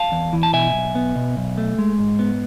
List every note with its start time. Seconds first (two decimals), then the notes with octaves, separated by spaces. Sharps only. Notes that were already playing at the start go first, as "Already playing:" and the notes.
Already playing: F5 A5
0.12 E2
0.33 E3
0.43 A5
0.53 B2 E5 G#5
0.74 B1
0.95 B3
1.16 B2
1.37 B1
1.58 A3
1.79 G#3
1.99 G#2
2.19 B3